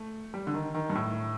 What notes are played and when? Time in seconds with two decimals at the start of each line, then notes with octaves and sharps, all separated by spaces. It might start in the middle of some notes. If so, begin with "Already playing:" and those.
Already playing: A3
0.34 G3
0.47 D3
0.54 D#3
0.75 D#3
0.90 G2
0.95 A2